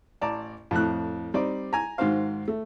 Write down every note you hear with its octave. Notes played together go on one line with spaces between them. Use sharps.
A1 D5 A5 A#5
F2 A2 F#6
G3 C4 D#4 C5 D5
G#5 A#5
G#2 D#3 F#4 C5 F5
A3